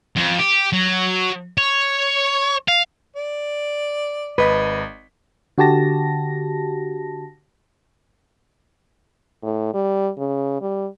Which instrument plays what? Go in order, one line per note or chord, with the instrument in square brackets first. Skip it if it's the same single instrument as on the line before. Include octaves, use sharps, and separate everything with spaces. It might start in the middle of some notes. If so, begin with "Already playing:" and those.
[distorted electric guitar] F2
G4
F#3
C#5
F5
[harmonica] D5
[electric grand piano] G#1 D#5 B6 [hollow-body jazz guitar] B4
[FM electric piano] D3 F#4 G4 A5 A#6
[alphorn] A2
G3
C#3
G3